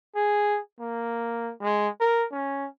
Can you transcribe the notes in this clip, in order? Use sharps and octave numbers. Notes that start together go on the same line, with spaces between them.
G#4
A#3
G#3
A#4
C#4